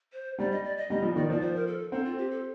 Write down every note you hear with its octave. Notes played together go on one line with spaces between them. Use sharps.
C5
G3 D5
D#5
D5
D#5
G3 D#5
F3
D#3 D5
F3 D5
C5
A#4
A4
C4 A4
F4
G4
A4